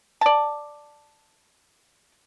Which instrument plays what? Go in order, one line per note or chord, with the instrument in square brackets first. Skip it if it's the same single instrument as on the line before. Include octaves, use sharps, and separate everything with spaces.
[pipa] D5 A5